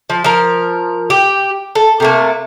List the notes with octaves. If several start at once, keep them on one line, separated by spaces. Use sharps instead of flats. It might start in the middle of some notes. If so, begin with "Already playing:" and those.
F3
F3 A#4
G4
A4
C3 A3 A#3